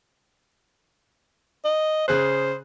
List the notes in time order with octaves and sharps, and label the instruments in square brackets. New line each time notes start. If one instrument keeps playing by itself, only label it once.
[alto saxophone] D#5
[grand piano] C#3 G#4 F#6 [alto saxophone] C5